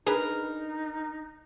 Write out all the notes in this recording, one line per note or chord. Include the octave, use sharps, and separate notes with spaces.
D4 D#4 G#4 A#4 B4